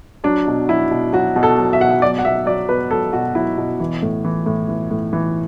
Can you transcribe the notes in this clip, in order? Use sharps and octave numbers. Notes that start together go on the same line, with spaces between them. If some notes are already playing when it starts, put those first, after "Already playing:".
F#3 D4
B2
F#3 E4
B2
F#3 F#4
B2
A4
F#3
E5
B2 F#5
E5
F#3 D5
F#5
B2 E5
F#3 D5
B2 B4
F#3 A4
B2 F#4
F#3 E4
B2
E3
A2
E3
A2
E3
A2
E3